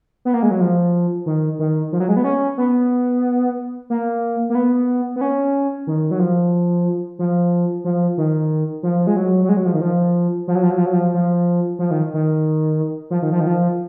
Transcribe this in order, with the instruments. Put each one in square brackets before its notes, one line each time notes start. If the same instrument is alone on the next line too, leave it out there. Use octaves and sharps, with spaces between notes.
[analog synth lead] B3
A#3
G#3
F#3
F3
D#3
D#3
F3
F#3
G#3
B3
C#4
B3
A#3
A#3
B3
B3
C#4
D#3
F#3
F3
F3
F3
D#3
F3
G#3
F#3
F#3
G#3
F#3
F3
D#3
F3
F3
F#3
F3
F#3
F3
F#3
F3
F3
F3
D#3
D#3
F3
D#3
F3
D#3
F3